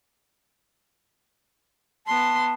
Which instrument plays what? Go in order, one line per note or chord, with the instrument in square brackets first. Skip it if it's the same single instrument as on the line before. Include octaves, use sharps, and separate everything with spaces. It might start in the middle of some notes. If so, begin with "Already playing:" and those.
[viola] B3 C6 [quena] A5